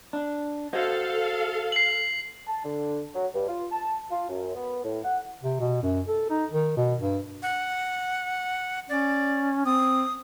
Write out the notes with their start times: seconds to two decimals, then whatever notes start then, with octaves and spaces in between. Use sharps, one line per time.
0.13 D4
0.73 F#4 A4 C5 D#5 F5
1.72 C7 F#7
2.48 A5
2.64 D3
3.15 F#3
3.34 G2
3.48 F4
3.72 A5
4.11 F4
4.29 F#2
4.55 B3
4.84 A2
5.04 F#5
5.43 C3
5.60 B2
5.82 F#2
6.08 A4
6.30 D#4
6.51 D#3
6.76 B2
7.00 G2
7.42 F#5
8.89 C#4 D5
9.65 C4 D#6